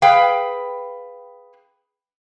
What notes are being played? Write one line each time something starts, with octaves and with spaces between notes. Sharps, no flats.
G#4 B4 F5 G5